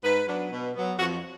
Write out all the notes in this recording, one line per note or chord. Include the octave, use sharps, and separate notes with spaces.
G#2 B4
F#3 B3 D4
B2
F#3 B3
F2 F#4